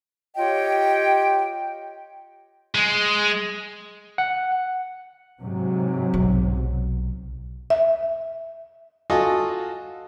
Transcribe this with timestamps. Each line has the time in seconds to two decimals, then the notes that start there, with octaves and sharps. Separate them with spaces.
0.37 F4 G4 C#5 D#5 G5
2.75 G#3
4.18 F#5
5.40 G#2 C3 F#3
6.14 B1
7.70 E5
9.10 F4 F#4 A4 D#5 G#5